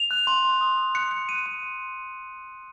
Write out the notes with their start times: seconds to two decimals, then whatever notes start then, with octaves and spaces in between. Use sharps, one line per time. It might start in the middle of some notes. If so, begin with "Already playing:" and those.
Already playing: F7
0.11 F#6
0.27 C6
0.44 C6
0.61 D#6
0.78 C6
0.95 F#6 C#7
1.11 F#6 C#7
1.29 C6 D#7
1.46 C6 D#7
1.63 C6